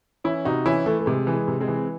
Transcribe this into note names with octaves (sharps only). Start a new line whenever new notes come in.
E3 C#4 E4
C3 D#4 F#4
E3 C#4 E4
E3 A3
A3
C3 G#3
E3
G#3
C3
G#3 C4
E3